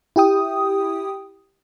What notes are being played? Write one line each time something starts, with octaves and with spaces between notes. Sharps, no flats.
E4 G4 G5 D#6